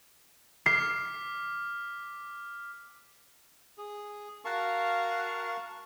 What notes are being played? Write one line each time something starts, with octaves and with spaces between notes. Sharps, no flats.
D6 F6 B6 C7
G#4
F#4 A#4 F5 A5 C#6